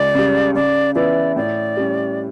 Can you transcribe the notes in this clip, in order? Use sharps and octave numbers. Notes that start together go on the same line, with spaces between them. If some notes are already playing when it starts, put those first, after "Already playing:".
Already playing: C#2 D5
C#3 G3
C#3 D5
E3 B3 E4 D5
A2 D5
G3 C#4